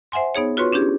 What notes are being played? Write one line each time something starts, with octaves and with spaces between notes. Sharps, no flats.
C5 E5 F#5 G#5 C6
B3 D#4 G#4 C#5
F4 F#4 B4 C#5 C6 C#6
C#4 D4 E4 G4 G#4